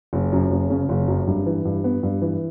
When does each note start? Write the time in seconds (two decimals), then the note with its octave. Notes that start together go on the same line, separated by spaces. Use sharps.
0.13 F#1
0.32 F#2
0.51 F#1
0.70 C#3
0.89 F#1
1.08 F#2
1.27 G2
1.46 E3
1.65 G2
1.84 B3
2.03 G2
2.22 E3